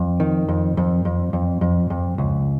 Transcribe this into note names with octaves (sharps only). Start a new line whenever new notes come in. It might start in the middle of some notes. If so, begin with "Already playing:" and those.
Already playing: F2
D#3
F2
F2
F2
F2
F2
F2
C#2